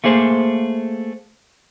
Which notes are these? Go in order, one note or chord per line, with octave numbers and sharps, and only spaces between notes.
A3 A#3 G#4 C5